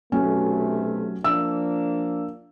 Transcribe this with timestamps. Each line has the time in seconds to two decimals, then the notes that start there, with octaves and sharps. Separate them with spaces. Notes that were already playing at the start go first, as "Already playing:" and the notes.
0.12 B1 C3 F#3 A3 C#4
1.24 F3 A#3 D4 E6